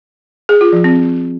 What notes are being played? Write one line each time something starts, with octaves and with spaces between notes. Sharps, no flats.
G#4
F4
F3
C4